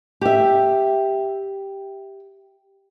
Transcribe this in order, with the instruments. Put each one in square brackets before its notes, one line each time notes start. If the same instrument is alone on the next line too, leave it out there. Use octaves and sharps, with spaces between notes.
[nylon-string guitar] G4 E5